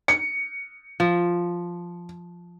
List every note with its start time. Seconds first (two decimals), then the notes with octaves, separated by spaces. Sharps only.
0.08 C#7
1.00 F3